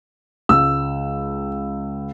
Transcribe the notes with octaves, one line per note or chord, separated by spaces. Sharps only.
C#2 E6